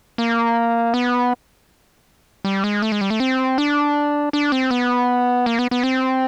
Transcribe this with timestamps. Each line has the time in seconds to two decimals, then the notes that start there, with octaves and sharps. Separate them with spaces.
0.18 A#3
0.94 B3
2.45 G3
2.64 G#3
2.82 A3
2.92 G#3
3.01 G3
3.10 A3
3.20 C4
3.58 D4
4.33 D4
4.52 C4
4.71 B3
5.46 A#3
5.59 B3
5.71 B3
5.84 C4